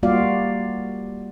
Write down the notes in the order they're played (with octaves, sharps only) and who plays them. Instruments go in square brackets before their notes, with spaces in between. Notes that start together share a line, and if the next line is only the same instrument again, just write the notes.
[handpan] G3 A#3 F4 F#4 D5 F5